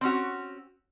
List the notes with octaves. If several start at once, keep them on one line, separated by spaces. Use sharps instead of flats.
C4 C#4 F#4